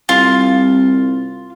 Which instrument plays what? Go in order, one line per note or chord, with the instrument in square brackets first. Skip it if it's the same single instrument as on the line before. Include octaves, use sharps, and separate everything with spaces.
[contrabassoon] C2 [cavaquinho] F4